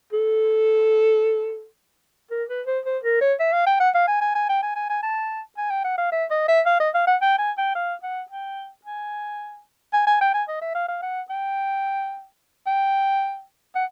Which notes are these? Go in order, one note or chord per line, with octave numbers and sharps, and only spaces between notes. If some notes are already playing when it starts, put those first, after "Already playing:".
A4
A#4
B4
C5
C5
A#4
C#5
E5
F5
G5
F#5
F5
G#5
G#5
G#5
G5
G#5
G#5
G#5
A5
G#5
G5
F#5
F5
E5
D#5
E5
F5
D#5
F5
F#5
G5
G#5
G5
F5
F#5
G5
G#5
G#5
G#5
G5
G#5
D#5
E5
F5
F5
F#5
G5
G5
F#5